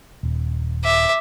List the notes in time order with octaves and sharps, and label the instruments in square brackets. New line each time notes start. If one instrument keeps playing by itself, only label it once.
[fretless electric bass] D#1
[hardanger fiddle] E5 D6